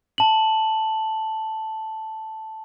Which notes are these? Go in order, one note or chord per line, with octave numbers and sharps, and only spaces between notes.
A5 F#7